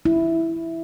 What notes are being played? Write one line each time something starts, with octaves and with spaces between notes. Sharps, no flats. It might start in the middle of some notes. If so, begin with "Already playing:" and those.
E4